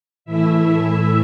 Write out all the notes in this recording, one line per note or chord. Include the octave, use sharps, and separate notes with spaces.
A2 E3 A3 E4 E5